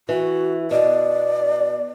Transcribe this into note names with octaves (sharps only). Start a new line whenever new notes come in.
E3 F#4
B2 D5